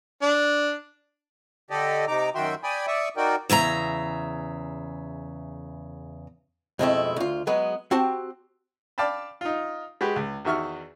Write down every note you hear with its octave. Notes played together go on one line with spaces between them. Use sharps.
D4
D3 G4 A4 D5 D#5
C3 D#4 A#5 D6
F#2 D#3 F#4 E5 G5 C6
D5 G5 G#5 B5 D#6
D5 E5 C#6 D#6
D#4 F#4 A#4 D5 G5
E2 C#3 E5 A#5
F2 B2 G#3 A3 C4 E4
D2 F4
F#3 G#3 B3 B4
C4 F#4 G4 C5 A5
D5 F5 G5 A5 B5
D#4 F4
G#3 F#4 G4 B4
C#2
E2 D#3 F#4 E5 C#6 F6